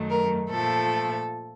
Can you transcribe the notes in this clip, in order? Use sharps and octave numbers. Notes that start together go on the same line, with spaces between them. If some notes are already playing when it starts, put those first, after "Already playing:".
Already playing: F#2 D#3 F#3 A3
A#4
A#2 F3 A3 A4